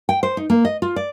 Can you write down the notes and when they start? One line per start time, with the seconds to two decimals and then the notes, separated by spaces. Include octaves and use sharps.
0.09 G5
0.23 C5
0.37 D#4
0.50 A#3
0.65 D#5
0.82 F4
0.96 D5